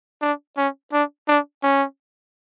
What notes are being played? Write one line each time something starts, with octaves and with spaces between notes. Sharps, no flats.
D4
C#4
D4
D4
C#4